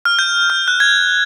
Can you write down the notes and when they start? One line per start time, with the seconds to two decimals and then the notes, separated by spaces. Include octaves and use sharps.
0.05 F6
0.19 G6
0.50 F6
0.68 F#6
0.80 G#6